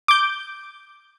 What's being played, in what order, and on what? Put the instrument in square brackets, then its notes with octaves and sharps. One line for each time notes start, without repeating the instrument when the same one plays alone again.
[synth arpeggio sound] D6 G6